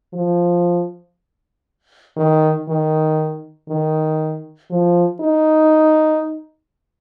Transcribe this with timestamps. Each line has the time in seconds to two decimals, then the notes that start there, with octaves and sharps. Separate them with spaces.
0.14 F3
2.17 D#3
2.68 D#3
3.69 D#3
4.71 F3
5.21 D#4